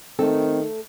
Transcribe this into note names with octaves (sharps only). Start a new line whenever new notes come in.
D#3 A3 C4 A4